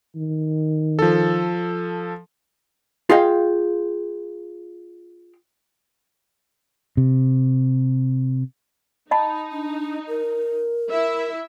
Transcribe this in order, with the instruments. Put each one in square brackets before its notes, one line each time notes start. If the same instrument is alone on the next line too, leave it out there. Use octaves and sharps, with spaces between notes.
[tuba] D#3
[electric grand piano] F3 A4
[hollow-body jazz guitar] F4 G#4 D#5 F5 G5
[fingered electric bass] C3
[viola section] D#4 [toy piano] D#5 A5 B5
[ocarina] D4
A#4
[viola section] E4 E5